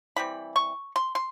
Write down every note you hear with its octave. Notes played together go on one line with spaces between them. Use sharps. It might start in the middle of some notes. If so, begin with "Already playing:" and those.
E3 G3 C4 B5
C#6
C6
C6